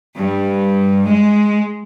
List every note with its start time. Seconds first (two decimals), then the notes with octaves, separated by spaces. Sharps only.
0.16 G2
1.07 G#3